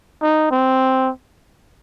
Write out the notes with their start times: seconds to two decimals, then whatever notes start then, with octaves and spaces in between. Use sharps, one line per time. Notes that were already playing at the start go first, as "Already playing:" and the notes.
0.22 D#4
0.51 C4